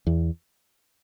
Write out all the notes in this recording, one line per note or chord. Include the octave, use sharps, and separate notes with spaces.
E2